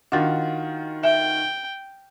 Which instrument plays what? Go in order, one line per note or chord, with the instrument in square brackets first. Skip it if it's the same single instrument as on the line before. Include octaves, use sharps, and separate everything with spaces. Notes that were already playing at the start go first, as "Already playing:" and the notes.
[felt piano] D#3 F4 F#4 [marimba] D4 A6
[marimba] E5 [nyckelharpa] G5